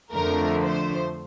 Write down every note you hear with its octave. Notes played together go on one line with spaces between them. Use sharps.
F2 D3 F3 A3 A#4
C5